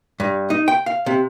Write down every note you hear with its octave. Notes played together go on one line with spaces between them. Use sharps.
G2
D#4
G5
F5
C3